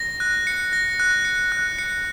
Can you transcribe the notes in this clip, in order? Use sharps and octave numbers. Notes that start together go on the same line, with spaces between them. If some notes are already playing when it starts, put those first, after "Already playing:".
Already playing: A#6
F#6
C#7
A#6
F#6
C#7
F#6
C#7